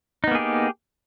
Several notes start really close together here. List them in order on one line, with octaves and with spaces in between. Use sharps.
D#4 B3 A#3 G#4 G4